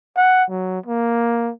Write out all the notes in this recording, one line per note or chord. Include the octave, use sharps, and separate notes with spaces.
F#5
F#3
A#3